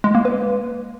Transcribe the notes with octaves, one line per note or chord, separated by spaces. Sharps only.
G#3
A#3
B4